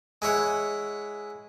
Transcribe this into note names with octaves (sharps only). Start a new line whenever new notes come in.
G#3 E4 C#5 F#5